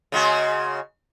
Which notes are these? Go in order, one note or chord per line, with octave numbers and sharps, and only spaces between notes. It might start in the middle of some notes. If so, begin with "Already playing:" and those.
C#3 G#3 F#4